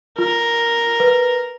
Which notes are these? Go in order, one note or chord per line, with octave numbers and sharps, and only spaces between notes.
F4 A#4
B4